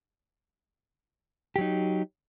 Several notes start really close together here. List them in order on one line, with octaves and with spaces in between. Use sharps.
G4 F#3 D#4